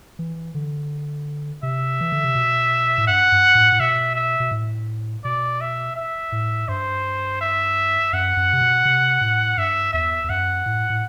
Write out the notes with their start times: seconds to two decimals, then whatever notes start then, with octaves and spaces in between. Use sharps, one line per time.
0.19 E3
0.55 D3
1.63 C3 E5
2.01 E3
2.12 D3
2.24 C3
2.35 B2
2.98 A2
3.07 G2 F#5
3.32 G2
3.55 A2
3.72 A2
3.80 B2 E5
4.15 E5
4.40 B2
4.51 A2
5.24 B2 D5
5.61 E5
5.96 E5
6.32 A2
6.68 G2 C5
7.41 E5
8.13 F#2 F#5
8.37 F#2
8.53 C3
8.62 B2
8.85 C3
9.21 A2
9.57 G2 E5
9.93 E2 E5
10.24 E2
10.30 F#2 F#5
10.66 A2
10.90 A2